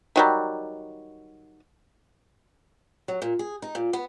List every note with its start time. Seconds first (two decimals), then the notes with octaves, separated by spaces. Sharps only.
0.16 D#3 F#3 G3
3.08 F#3
3.22 A#2
3.39 G#4
3.62 D#4
3.75 A#2
3.93 B3